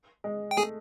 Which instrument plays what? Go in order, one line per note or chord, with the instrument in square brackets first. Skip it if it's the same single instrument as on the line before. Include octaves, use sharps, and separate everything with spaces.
[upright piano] G#3
[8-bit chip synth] G5
[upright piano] A3 [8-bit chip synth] G#4 G#5